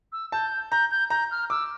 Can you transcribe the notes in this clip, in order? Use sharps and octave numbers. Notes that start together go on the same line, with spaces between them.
E6
A5 G6
A#5 G6
G6
A#5 G6
F6
D6 E6